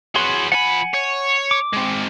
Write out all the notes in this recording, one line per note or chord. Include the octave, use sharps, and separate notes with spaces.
F#4 G#4 B4 C#5 C6
F3 F#5 G#5 B5
C#5
D6
G#3 C4